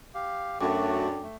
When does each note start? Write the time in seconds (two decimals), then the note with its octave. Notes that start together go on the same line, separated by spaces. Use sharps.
0.14 G4 F5
0.61 F#2 A3 D4 F#4 A4 G5 D6
1.23 A3